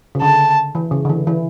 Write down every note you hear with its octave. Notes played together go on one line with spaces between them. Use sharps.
C#3
D3 A5
E3
C#3
D3
E3
E3